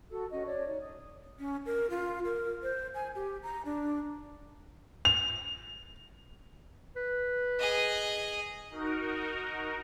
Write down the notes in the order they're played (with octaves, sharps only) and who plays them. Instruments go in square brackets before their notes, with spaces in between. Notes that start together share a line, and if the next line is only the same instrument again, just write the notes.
[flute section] F#4 A4 E6
C#4 F#4 D#5 C#6
C#5 D5
D#4 C#5
D#6
[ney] C#4
A#4
F4
A#4
C5
G#5
G4
A#5
D4
[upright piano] F7
[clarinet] B4
[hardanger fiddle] G#4 D#5
[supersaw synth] D#4 F#4 A#4